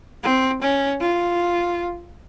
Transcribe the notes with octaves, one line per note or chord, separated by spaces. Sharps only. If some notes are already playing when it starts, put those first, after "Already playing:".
C4
C#4
F4